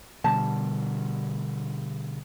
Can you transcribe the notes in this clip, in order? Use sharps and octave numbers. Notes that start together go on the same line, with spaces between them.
B2 D3 G3 A5